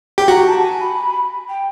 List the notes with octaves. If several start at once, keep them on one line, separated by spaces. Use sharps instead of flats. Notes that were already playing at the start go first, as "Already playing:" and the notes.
G4
F#4 A#5
A5
G#5
B5
G5